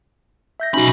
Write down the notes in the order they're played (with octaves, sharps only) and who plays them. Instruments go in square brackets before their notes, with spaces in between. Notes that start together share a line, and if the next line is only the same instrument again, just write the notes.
[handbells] E5 G6 A#6
[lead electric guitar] B1 B5 [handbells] C#4 D#4 F#4